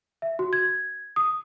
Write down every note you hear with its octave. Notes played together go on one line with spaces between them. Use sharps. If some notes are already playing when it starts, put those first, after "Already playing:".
E5
F#4
G#6
D#6